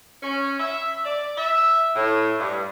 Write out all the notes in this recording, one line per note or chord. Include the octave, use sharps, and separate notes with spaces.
C#4
E5
D5
E5
A2
G2